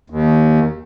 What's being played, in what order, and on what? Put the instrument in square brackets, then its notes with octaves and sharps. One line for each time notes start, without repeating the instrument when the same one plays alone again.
[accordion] D#2